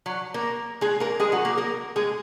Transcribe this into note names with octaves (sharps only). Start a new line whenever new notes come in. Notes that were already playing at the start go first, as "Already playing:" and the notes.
F#3
A#3 A#4
G#3 G#4
A#3 A#4
G#3 G#4
F#3 F#4
A#3 A#4
A#3 A#4
G#3 G#4